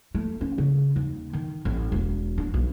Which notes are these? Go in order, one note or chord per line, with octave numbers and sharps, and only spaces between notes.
A3
C#4
C#3
D#2
D#3
A1
E1
D4
B1